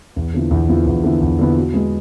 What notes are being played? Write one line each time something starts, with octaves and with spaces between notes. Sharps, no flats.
E2
D3 F3 B3 E4
E2
D3 F3 B3 E4
E2
D3 F3 B3 E4
E2
D3 F3 B3 E4
B2
G#3 B3